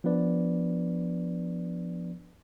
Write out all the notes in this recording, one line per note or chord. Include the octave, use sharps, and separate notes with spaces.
F3 B3 D4 B4 D5